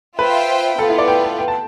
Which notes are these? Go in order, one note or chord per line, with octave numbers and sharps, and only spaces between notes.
F4 B4 C5 E5 G5
B3 F4 A4 B4
E4
D5
G5
A5
G5
A5